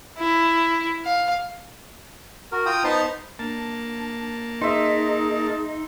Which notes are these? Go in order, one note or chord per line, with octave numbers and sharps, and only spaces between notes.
E4
F5
F#4 A#4
F4 G5 A#5 D#6
B3 D#4 C5 A5 A#5 C6
A#3 D4 A5
D#4 G#4 E5 C6